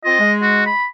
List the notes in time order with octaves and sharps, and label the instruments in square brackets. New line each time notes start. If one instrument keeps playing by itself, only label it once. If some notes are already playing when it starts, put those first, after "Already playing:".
[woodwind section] C4 F4 [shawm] D#5
[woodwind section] G#3
[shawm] F#4
B5